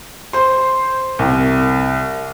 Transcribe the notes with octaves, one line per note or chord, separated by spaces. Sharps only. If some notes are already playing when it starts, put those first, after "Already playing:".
C5 C6
C2